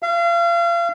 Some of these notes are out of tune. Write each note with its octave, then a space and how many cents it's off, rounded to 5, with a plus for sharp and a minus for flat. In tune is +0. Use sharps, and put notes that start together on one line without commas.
F5 -35